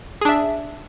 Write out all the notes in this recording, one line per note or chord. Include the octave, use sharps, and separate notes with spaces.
D4 G#4 E5